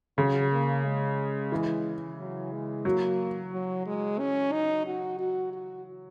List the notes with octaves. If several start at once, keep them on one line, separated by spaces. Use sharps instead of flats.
C#3 F#3
A#3
G#3
E3
F#3
G#3
F#3 A#3
F#3
G#3
C#4
D#4
F#4
F#4
F#4